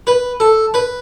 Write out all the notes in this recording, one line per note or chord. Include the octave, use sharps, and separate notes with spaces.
B4
A4
B4